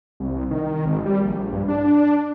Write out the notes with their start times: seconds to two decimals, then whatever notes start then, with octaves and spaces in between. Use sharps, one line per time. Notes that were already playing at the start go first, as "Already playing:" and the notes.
0.20 C2
0.51 D#3
0.85 G#1
1.06 G3
1.22 A#1
1.53 G2
1.68 D4